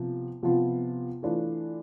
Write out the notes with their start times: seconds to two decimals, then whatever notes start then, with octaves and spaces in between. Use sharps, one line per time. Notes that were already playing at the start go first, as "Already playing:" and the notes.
Already playing: C3 F3 B3
0.43 C3 F3 B3 F4
1.23 E3 A3 D4 F4